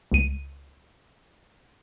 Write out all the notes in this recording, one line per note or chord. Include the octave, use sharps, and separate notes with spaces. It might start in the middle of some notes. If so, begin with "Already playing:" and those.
C#2 D#7